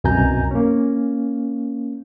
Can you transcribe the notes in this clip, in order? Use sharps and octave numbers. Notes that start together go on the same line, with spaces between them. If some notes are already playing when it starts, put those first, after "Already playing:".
C2 F#2 B2 G#5 A#5 G6
A#3 C#4